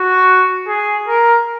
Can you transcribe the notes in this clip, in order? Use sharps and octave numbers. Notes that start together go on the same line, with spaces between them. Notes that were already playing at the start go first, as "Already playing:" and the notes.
Already playing: F#4
G#4
A#4